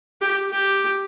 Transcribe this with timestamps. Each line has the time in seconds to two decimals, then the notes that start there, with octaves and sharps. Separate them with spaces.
0.21 G4
0.50 G4